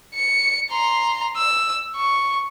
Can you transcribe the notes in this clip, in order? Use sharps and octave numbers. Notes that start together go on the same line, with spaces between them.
C#7
A#5 C6
E6
C#6